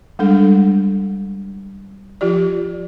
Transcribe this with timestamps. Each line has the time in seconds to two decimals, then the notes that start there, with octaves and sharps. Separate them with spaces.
0.19 G3 G#3 D4 A4
2.21 F3 F4 G4 D5